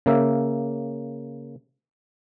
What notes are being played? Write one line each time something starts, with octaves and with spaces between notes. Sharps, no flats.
C#3 A#3 E5